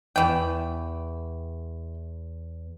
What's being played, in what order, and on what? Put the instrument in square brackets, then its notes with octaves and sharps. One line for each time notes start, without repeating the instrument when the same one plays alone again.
[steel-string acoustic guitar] E2 [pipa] E3 G5